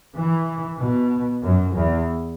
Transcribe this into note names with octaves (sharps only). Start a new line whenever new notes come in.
E3
B2
F#2
E2